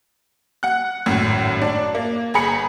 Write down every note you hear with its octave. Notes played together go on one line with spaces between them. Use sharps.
F#5 F#6
G#1 F#2 A2
D4
A#3
G1 G#4 A#5 B5 C#7